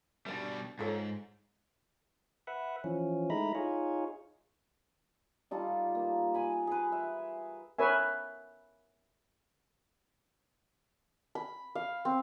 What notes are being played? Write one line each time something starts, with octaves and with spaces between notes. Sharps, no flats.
B2 G3 D4 D5 E5
G#2 F4 A4 C#5
B4 E5 F#5
E3 F3 C#4
G#3 A3 D#4 E4 A#5 B5
D#4 F4 G#4 C#5
G3 D#4 F4 A4
A#3
B4 G#5 B5
G#4 B4
E5
A#4 B4 C#5 E5 G#5
B5
F5
C4